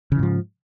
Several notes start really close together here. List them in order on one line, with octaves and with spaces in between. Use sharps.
C#3 E3 G#2 F3